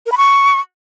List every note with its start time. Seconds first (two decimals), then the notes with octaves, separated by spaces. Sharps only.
0.06 A#4
0.12 B5
0.17 C#6